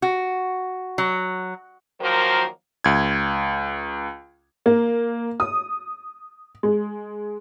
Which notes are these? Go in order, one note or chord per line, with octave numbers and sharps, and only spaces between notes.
F#4
F#3
D#3 F3 F#3 A#3 A#4 C5
C#2 G#6
A#3
D#6
G#3